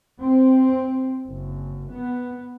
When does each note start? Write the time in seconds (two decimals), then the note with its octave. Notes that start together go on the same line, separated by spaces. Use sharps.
0.19 C4
1.25 F#1
1.90 B3